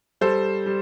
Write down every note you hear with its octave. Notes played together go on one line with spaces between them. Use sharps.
G3 A4 C5
G3